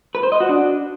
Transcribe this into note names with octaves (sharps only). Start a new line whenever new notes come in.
B4
C5
D#5
F#4
D4